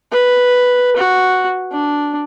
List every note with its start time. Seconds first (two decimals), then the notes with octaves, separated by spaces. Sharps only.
0.11 B4
0.97 F#4
1.72 D4